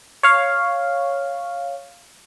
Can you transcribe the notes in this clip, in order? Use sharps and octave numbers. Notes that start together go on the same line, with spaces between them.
C#5 F5